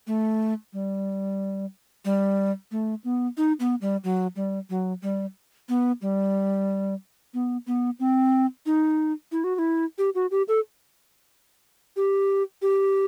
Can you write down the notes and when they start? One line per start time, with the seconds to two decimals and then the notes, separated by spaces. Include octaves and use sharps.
0.07 A3
0.73 G3
2.05 G3
2.71 A3
3.04 B3
3.37 D#4
3.60 B3
3.81 G3
4.04 F#3
4.36 G3
4.70 F#3
5.03 G3
5.69 B3
6.02 G3
7.34 B3
7.67 B3
8.00 C4
8.66 D#4
9.32 E4
9.44 F#4
9.55 F#4
9.59 E4
9.98 G4
10.15 F#4
10.31 G4
10.48 A4
11.96 G4
12.62 G4